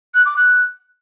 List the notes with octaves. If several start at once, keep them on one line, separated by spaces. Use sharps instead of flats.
F#6
D6
F#6